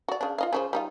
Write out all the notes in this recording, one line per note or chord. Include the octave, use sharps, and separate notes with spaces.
F#4 D5
C#3 D4
F4 D#5 F5
C#3 F3 C5
G3 D#4 F4